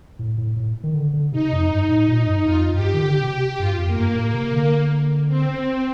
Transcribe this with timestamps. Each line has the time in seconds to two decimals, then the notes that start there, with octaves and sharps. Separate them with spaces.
0.19 A2
0.38 A2
0.56 A2
0.83 D#3
0.94 D3
1.13 D3
1.32 C3 D#4
1.52 F2
1.71 G2
1.88 A2
2.08 A#2
2.26 G2
2.45 F2 F4
2.74 G2 G4
2.94 D#3
3.02 D3 G4
3.21 C3
3.59 G2 F4
3.78 F2
3.87 A#3
3.96 G2
4.15 A2
4.34 C3
4.53 D3
5.28 C4